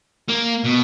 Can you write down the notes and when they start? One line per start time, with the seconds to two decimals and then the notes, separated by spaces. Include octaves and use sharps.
0.29 A#3
0.65 B2